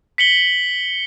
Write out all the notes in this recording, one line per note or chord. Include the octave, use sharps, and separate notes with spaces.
B6 C#7 F#7 G7